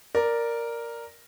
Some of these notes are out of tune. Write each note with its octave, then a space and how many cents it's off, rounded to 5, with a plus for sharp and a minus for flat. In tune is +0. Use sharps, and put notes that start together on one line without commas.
A#4 +0 D5 +0